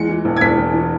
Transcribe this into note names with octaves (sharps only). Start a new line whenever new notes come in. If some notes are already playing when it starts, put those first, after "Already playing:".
Already playing: E2 G#3 C#7
E3
E1
G#6
E1 B6
E2
E3